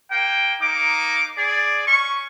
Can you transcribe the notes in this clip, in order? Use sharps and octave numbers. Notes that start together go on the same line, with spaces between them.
A#3 G5
A#3 D#4 D6
G#4 D5
C#4 C#6